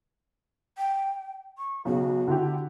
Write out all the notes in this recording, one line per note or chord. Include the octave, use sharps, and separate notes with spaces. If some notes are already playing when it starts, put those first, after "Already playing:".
G5
C#6
B1 C#3 F#4
D3 E4 G4